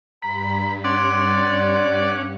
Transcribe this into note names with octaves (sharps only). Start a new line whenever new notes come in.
G2 A#5 B5
C#4 D5 F#5 C6